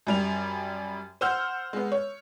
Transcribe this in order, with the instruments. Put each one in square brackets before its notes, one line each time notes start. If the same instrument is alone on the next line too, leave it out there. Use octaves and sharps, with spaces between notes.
[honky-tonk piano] F#2 G3 F7
C5 F#5 E6 F6 G6
G#3 B3
C#5